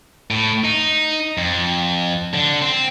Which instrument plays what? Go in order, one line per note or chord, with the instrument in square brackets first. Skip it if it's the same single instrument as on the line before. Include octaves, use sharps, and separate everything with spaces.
[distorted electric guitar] A2
D#4
F2
D3
C4